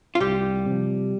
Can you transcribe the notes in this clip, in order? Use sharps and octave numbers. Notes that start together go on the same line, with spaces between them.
F4
C2 G3 G4
C3 F3